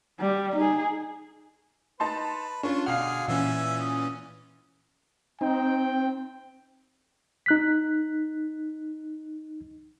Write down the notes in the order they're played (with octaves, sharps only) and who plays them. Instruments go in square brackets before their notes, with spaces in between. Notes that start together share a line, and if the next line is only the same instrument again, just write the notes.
[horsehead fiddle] G3
D#4 G#4
[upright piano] D#4 A5 C6 [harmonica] B4
[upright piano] C#4 [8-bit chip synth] D4 F4 [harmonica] C#6
[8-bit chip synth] B2 F6 [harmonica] D3 G#4 [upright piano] F5 F#5
[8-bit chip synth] A#2 E3 C#4 [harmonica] E5 G#5
[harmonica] D#6
[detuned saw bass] C4 [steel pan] D#4 [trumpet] G5
[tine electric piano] D#4 F#6 B6